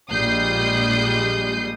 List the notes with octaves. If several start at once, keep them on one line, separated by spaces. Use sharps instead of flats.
A#1 G3 G#3 D#6 G6 C7